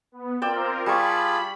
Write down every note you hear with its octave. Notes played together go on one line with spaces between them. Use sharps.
B3
C4 F4 A#4 D5 G5 E6
G3 F4 G#4 A5 B5 C#6